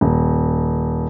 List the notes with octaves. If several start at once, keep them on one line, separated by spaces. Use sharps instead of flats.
D#1